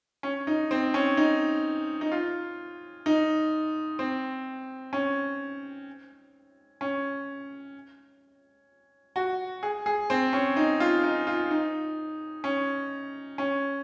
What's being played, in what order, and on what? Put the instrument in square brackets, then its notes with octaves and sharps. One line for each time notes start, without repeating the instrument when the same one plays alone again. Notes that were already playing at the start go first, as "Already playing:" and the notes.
[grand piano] C#4
D#4
C4
C#4
D#4
D#4
F4
D#4
C4
C#4
C#4
F#4
G#4
G#4
C4
C#4
D#4
F4
D#4
F4
D#4
C#4
C#4